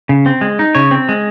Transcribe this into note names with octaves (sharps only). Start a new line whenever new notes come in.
C#3
C4
G#3
D#4
C#3 C#5
C4
G#3